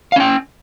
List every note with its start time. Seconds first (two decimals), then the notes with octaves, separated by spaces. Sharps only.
0.12 F5
0.16 C#4
0.20 G5